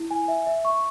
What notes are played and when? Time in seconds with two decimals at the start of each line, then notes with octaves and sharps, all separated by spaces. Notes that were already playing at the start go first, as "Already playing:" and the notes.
Already playing: E4
0.11 G#5
0.28 E5
0.47 E5
0.65 C#6